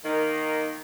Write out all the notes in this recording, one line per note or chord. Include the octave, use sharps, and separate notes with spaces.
D#3 A#3